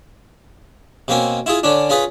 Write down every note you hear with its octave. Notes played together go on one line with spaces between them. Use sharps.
B2 A#3 C4 C#4
E4 F4 G#4
D3 C#4 D4
C#4 F4 G#4 B4